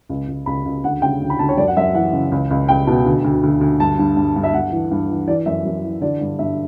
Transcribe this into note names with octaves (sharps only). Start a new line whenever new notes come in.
C#2
C#2
C#2 B5
C#2
D2 F#5
C#3 G5
D2
B5
D2 A5
C#5
F#2 D5
F#5
F#2 E5
E3 F#5
C#3
C#2
C#2
C#2 G5
B2
D2
D2
D2
D2
G2 A5
G2
G2
G2
E5
G2 F#5
E3
G2
E3
E3 D5
F#2 E5
F#2
E3
D3 D5
G2
G2 E5